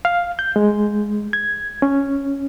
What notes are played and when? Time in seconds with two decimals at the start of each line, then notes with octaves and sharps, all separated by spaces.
0.05 F5
0.39 G6
0.56 G#3
1.33 G#6
1.82 C#4